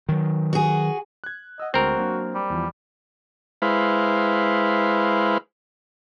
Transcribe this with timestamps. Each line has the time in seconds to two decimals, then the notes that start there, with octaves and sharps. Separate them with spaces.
0.09 D#3 F#3
0.53 F#4 G#4
1.24 F#6 G#6
1.60 D#5 F#5 E6
1.74 D2 G#3 C4 F#4 A#4 F6
1.97 F#3 A#3 D4
2.35 G3
2.50 E2 E3 F3
3.62 G#3 E4 B4 C5 F5